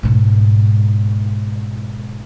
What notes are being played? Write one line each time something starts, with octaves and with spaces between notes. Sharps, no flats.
G#2 B2